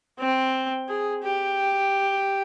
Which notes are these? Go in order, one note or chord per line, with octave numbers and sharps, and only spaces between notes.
C4
G#4
G4